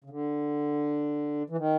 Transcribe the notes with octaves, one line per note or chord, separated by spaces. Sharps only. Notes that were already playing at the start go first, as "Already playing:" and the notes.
C#3
D3
E3
D#3